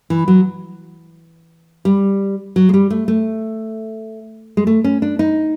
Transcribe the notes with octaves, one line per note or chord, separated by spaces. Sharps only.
E3
F#3
G3
F#3
G#3
G3
A3
A3
G#3
A3
C#4
D4
D#4